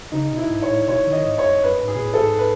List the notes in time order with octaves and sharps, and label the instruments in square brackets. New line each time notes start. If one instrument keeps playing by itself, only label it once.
[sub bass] C#3 [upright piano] D#4
[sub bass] B2
[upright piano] E4
[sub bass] G#2
[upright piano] C#5
[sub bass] A2
[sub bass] B2 [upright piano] C#5
[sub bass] D#3
[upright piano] D#5
[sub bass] G#2
[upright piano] C#5
[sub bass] F#2
[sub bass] F#2 [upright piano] B4
[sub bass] G#2
[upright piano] G#4
[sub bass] B2
A2
[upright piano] A4
[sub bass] G#2
[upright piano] B4